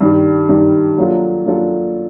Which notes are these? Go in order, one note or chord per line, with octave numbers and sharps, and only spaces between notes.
G2 D#3 G3
G2 D#3 G3
F#3 A#3 D4 F4 A4
F#3 A#3 D4 F4 A4